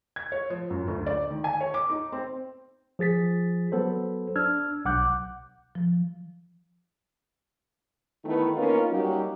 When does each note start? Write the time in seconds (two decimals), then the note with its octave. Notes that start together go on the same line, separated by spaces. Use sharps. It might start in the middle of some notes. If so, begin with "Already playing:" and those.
0.16 G#6
0.32 C#5
0.50 F3
0.70 F#2
0.88 D2
1.07 D5
1.31 D#3
1.44 G#5
1.61 C#5
1.74 D6
1.90 D#4
2.12 C4
2.99 F3 G#4 A6 B6
3.72 F#3 B3 A4 C5
4.36 D4 E6 F6 G#6
4.85 B1 F#5 D6 F#6 G6
5.75 F3
8.25 D#3 E3 A3 B3 E4
8.56 A#3 B3 C#4 D#4 F4 A#4
8.91 F#3 G3 A#3 C#4 D#4 G4